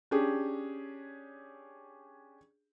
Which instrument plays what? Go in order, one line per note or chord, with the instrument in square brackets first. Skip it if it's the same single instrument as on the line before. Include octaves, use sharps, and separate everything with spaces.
[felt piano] C#4 D4 G4 G#4